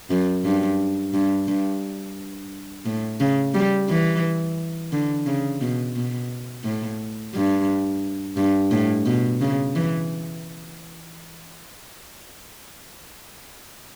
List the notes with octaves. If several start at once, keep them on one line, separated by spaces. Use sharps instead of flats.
F#2
G2
G2
G2
A2
C#3
G3
E3
D3
C#3
B2
B2
A2
G2
G2
A2
B2
C#3
E3